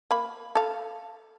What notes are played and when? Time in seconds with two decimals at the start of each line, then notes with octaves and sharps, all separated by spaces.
0.11 A#3 B5
0.55 A4 F5